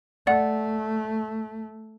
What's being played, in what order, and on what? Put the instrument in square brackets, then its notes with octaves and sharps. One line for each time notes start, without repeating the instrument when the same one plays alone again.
[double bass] A3 [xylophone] D5 F#5